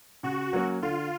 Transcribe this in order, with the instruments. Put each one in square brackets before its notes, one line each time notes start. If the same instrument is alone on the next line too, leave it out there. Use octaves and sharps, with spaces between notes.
[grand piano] C#3 [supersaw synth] F#4
[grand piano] F#3 A#3 C#4
[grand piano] D3 [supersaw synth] F4